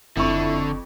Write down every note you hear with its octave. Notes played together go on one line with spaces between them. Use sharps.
F#1 F2 D3 E4 C#6